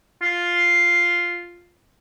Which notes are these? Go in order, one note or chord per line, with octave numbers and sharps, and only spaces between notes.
F4